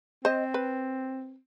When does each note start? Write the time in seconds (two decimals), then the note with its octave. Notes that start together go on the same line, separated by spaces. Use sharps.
0.25 C4 C5 D#5
0.54 B4